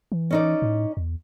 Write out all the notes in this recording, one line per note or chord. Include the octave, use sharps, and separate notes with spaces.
E3
C#4 D#4 D5
A2
E2